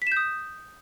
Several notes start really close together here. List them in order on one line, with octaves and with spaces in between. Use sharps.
B6 E7 G6 D#6